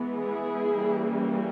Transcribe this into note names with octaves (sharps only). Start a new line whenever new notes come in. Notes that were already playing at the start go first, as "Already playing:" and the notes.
Already playing: E3 G#3 B3
E4 G#4
E3 G3 A#3 C#4